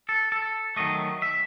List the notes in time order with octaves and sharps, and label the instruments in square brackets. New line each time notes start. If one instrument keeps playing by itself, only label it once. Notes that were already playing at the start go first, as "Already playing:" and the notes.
[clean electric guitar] A4
A4
D#3 F#3 A3 D#5
E5